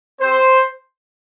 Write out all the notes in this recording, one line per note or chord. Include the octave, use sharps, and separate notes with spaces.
C4 G4 C5